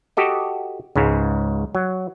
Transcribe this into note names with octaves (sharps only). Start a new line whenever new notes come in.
F#4 G4 A4 D#5
C#2 G#2 C#3
F#3